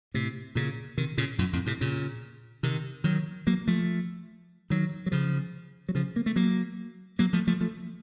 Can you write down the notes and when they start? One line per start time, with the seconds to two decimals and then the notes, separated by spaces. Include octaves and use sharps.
0.14 A2 C3
0.55 A#2 C#3
0.98 C3 D#3
1.18 A#2 C#3
1.39 F#2 A#2
1.53 F2 A2
1.66 A2 C3
1.81 A#2 C#3
2.63 C3 D#3
3.04 D#3 F#3
3.47 F#3 A#3
3.67 F3 A3
4.70 D#3 F#3
5.06 F#3
5.12 C#3 F3
5.89 F#3
5.95 C#3 F3
6.16 A#3
6.26 A3
6.36 F#3 A#3
7.19 F#3 A#3
7.33 F3 A3
7.47 F3 A3
7.61 F3 A3